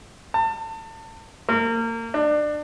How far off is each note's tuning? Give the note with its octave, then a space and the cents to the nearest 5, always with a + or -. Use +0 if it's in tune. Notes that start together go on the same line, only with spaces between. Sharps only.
A5 +30
A#3 -30
D4 +25